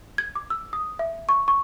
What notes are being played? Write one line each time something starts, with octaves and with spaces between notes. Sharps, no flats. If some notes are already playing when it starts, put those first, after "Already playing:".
G#6
D6
E6
D#6
E5
C#6
C#6